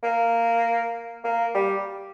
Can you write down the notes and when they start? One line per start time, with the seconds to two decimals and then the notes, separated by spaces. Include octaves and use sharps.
0.03 A#3
1.24 A#3
1.55 G3